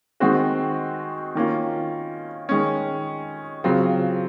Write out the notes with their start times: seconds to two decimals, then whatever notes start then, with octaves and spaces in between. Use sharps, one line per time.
0.20 D#3 G#3 C4 F#4
1.35 D#3 A#3 C#4 F4
2.49 D#3 G#3 C#4
3.64 C#3 F#3 C4 F4